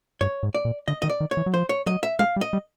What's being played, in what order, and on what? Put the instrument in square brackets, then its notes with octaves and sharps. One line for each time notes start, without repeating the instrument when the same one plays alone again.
[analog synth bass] G2 [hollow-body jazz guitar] C#5
[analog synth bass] G#2
[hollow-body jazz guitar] D5
[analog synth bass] A#2
[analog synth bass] D3 [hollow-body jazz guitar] D#5
[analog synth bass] D#3 [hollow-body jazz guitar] D#5
[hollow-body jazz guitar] D5
[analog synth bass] D#3
[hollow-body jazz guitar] C#5
[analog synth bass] E3
F#3
[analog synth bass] F3 [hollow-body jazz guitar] C5
[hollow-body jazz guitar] C#5
[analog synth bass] F#3 [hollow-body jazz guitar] D#5
[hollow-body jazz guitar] E5
[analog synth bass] G#3 [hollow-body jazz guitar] F5
[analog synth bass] G3
[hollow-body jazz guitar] D#5
[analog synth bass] G3